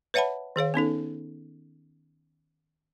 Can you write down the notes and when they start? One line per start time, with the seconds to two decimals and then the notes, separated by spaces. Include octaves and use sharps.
0.14 B4 C#5 E5 F#5 A5 B5
0.56 D#3 G#4 C#5 F5
0.74 B3 C#4 D#4 A4